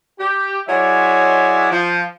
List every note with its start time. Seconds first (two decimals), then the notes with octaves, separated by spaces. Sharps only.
0.19 G4
0.68 F#3 G#3 E4 C#5 D5 E5
1.71 F3